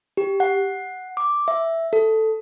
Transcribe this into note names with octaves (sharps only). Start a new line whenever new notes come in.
G4
F#5
D6
E5
A4